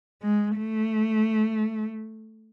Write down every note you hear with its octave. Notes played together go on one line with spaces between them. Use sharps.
G#3
A3